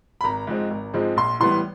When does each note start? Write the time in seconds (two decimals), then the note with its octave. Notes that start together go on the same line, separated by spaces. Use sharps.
0.21 B5
0.24 G#1 A#5
0.47 G#2 F3 G#3 C4
0.71 G#1
0.94 G#2 F3 G#3 C4
1.17 A#1 C6
1.40 A2 E3 G3 B3 C6